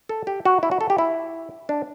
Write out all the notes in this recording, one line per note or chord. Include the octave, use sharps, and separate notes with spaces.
A4
G4
F#4
E4
F#4
A4
G4
E4
D4